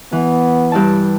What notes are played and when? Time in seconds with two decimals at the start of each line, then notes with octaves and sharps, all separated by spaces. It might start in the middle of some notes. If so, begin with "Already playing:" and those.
0.12 E3 B3
0.72 G2 E4 A5